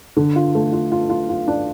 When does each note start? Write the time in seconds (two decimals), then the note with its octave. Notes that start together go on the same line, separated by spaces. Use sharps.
0.17 D3
0.36 F4
0.55 A3
0.72 F4
0.92 F4
1.10 F4
1.29 F4
1.48 D4